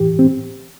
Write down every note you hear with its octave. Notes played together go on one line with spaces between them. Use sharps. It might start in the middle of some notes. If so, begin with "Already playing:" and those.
Already playing: A2 E3 G4
C4